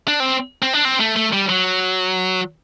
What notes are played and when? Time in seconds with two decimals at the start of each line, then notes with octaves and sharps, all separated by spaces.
0.08 D4
0.20 C4
0.62 C4
0.73 D4
0.85 C4
1.00 A3
1.16 A3
1.33 G3
1.49 F#3